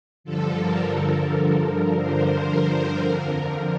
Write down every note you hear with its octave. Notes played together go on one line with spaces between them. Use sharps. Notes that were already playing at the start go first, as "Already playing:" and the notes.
G2 D3 F3 A4
A#4
A4
G2 D3 F3 A#4
C5
C5
F2 D3 F3 A#4